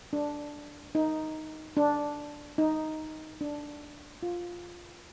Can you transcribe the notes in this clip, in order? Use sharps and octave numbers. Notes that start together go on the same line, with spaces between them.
D4
D#4
D4
D#4
D4
F4